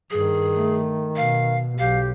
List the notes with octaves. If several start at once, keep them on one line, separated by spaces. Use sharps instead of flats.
G2 D#3 G#4
A3
B2 F5
B1 G4 F5